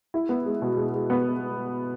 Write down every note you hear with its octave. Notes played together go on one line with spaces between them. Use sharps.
E4
B3
G#3
B2
G#3
G#3
B3